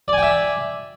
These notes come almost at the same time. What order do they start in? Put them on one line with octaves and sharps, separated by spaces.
D5 G#5 G5 E5